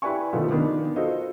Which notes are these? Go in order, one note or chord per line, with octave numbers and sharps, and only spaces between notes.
E4 G4 B4 D5 G#5 C#6
B2 D#3 F3 A3 B3
D#3 B3 D4
F4 F#4 A4 C5 D#5